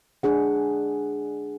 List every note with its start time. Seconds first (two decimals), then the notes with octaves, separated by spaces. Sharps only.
0.23 D4 G#4 F#5